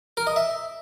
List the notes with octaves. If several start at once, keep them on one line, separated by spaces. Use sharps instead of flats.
A#4
D#5
E5